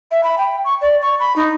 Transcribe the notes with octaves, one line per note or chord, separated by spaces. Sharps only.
E5
B5
G5
C#6
D5
C#6
B5
D#4